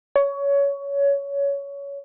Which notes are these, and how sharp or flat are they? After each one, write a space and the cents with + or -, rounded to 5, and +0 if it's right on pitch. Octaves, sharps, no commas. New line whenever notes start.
C#5 +20